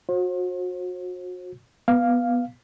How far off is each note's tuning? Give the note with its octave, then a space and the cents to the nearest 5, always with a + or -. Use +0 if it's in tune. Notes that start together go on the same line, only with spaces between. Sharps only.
F#4 -30 C5 +40
B3 -5 F5 +0